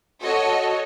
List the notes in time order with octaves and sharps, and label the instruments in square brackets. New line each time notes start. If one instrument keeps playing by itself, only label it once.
[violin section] F#4 A4 C#5 D#5